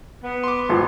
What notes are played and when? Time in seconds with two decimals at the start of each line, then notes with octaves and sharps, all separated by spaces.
0.23 B3
0.44 C6 D6
0.69 G#1 F4